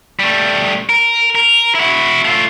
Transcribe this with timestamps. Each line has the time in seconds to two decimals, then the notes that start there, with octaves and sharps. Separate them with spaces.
0.19 G3 A3
0.89 A#4
1.35 A#4
1.75 E4 F#4
2.25 A3 F4